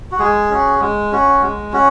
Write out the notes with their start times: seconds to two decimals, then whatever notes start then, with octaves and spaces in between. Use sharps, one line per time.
0.12 F#4
0.19 G#3 G#4
0.51 C#4 F#4
0.81 G#3
1.12 C#4 F#4
1.43 G#3
1.73 C#4 F#4